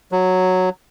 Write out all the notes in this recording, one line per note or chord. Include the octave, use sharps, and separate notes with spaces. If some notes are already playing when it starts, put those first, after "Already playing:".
F#3